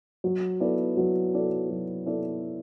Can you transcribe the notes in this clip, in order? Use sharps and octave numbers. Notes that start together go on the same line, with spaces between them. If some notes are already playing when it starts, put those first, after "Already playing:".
F#3
B3 E4 A4 D5
F#3
B3 E4 A4 D5
F#3
B3 E4 A4 D5